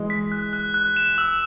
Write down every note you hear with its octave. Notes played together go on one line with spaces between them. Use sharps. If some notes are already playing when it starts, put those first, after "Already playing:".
Already playing: E3 G#3
B6
F#6
F#6
F#6
E7
E6